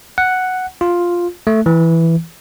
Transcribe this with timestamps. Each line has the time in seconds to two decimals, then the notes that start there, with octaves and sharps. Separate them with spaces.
0.18 F#5
0.81 F4
1.47 A3
1.66 E3